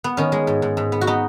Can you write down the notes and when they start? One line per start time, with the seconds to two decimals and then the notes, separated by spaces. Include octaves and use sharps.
0.04 B3
0.17 D#3 C#4
0.32 G#3
0.47 G#2
0.62 G#2
0.77 G#2
0.92 B3
1.01 F#4
1.07 B3 D#4